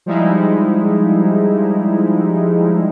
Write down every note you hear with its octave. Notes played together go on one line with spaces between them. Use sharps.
F3 G3 G#3 D#4 E4